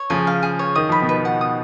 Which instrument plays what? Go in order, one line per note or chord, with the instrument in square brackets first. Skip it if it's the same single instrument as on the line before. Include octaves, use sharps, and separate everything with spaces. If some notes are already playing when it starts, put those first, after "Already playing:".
Already playing: [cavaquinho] C#5
[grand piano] C#3 F3 [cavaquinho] G#5
[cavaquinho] F5
G#4
C#5
[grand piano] D#3 [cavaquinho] D#6
[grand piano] F3 [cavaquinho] B5
[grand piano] B2 D#3
[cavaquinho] B4
F#5
D#6